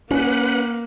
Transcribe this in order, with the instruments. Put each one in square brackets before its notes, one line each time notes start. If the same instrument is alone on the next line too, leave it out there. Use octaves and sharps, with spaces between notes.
[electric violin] A#3 [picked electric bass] C#4 [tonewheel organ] B4 F#5